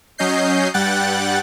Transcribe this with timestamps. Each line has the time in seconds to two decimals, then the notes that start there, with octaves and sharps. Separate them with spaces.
0.18 F#3 C#4 D#5 G6 C7
0.74 G2 G3 F#5 G5 F#6 A6